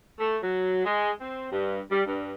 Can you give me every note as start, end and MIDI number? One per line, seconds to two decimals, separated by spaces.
0.20 0.36 57
0.43 0.84 54
0.85 1.11 56
1.21 1.45 60
1.52 1.79 43
1.91 2.03 55
2.05 2.33 43